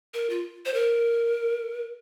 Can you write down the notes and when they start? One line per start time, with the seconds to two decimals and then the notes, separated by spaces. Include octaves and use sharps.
0.14 A#4
0.30 F4
0.66 C5
0.74 A#4